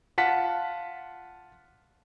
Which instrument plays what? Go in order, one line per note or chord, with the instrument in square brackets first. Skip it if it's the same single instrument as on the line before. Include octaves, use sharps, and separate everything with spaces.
[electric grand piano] F4 F#5 A5 B6